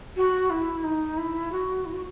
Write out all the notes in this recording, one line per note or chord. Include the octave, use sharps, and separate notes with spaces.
F#4
E4
D#4
E4
F#4
E4
F#4